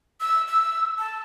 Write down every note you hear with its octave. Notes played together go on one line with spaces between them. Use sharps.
E6
E6
A5